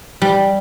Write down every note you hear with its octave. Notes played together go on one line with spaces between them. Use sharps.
G3